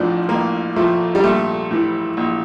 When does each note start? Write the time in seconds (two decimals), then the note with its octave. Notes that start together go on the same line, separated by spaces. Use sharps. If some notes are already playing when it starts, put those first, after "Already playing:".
Already playing: A1 A2 F3 D4
0.29 A1 A#3
0.76 A2 F3 A3
1.15 G3
1.23 A#1 A3
1.71 A2 E3
2.17 A#1